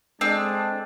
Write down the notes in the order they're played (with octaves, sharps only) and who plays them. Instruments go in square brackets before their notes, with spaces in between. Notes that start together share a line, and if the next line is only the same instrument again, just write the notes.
[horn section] G#3 D4 [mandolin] C4 [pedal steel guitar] A4 D#5 A5